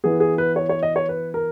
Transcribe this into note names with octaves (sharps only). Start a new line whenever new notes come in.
E3 B3 G#4
G#4
B4
C#5
C#5
D#5
C#5
B4
A#4